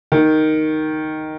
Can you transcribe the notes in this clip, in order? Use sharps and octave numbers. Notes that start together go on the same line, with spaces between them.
D#3